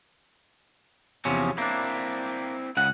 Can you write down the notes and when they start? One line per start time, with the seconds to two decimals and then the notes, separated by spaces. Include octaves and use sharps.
1.25 E2 C3 F3 F#3 C#4
1.58 A#3 C4 D4 E4
2.77 C#2 C#3 F#5